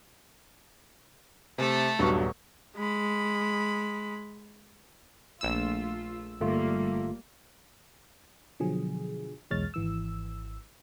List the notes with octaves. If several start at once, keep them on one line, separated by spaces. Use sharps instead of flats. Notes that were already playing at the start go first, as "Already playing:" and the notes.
C3 A3 A4
D#1 G2 F#3 B3 C#6
G#3 B5
A#1 A3 F4 E6
G1 G3 A3 A#3 F4
B2 D3 F3 F#3 G#4
B1 E2 G#3 C#5 F6 A6
G#1 E3 E6